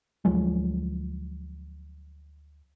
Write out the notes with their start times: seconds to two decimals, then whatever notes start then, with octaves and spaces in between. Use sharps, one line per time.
0.25 D2 F3 F#3 G#3